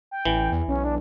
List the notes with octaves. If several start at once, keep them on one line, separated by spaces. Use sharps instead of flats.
G5
A1 E3
E2
B1 C#4
D4